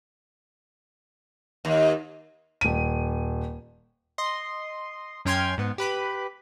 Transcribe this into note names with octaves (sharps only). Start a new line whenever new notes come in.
D#2
D#1 D#7
D#5 C6
F#2 C#4 G5 C6 F6 G#6
G#2 B3
G4 B4 B5